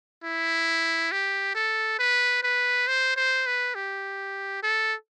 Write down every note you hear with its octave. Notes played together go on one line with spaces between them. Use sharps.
E4
G4
A4
B4
B4
C5
C5
B4
G4
A4